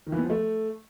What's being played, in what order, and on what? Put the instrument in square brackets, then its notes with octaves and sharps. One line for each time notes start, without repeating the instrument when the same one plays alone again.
[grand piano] D#3
E3
B3
F3
A3